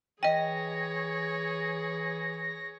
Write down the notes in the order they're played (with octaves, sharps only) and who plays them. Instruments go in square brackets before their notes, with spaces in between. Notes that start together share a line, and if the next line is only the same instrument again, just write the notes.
[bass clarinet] E3 [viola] G#4 C#5 [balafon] D#5 G5 [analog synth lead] A#6